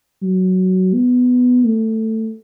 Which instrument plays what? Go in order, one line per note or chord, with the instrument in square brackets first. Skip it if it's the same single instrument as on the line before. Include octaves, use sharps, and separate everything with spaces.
[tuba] F#3
B3
A3